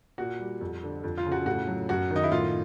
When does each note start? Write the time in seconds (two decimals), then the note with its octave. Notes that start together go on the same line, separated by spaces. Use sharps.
0.18 A#2 F#4
0.39 G3
0.61 F2
0.83 D3
1.04 F2
1.17 F4
1.26 C#3
1.32 F#4
1.46 A2 F#4
1.67 F#3
1.89 F#2 F#4
2.10 D#3
2.16 D#4
2.23 E4
2.32 A2 F4